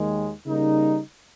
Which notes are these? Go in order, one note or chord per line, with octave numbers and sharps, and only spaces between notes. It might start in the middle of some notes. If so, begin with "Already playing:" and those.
Already playing: D#2 D#3 G#3
C#3 G3 A#3 D#4